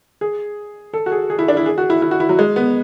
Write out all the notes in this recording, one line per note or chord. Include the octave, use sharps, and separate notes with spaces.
G#4
A4
F#4
G#4
G#4
E4
D4
E4
G#4
F#4
E4
E4
F#4
E4
F#3
G#3
B3